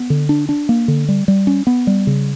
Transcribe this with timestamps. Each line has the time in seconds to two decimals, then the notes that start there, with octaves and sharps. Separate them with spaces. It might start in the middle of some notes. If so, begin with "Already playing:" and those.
Already playing: B3
0.10 D3
0.29 D4
0.49 D4
0.69 A#3
0.88 D3
1.09 G3
1.28 G3
1.47 C#4
1.67 B3
1.87 G3
2.07 C#3